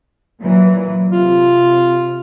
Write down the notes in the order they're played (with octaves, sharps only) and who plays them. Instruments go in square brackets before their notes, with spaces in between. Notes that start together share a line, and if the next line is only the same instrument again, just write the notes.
[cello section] A#2 E3 F#3
[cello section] C3 [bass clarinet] F4